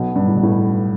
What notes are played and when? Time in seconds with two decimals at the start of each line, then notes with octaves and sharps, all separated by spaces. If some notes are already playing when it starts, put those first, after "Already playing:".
Already playing: B1 B2
0.16 G2
0.28 A2
0.36 B2
0.43 A2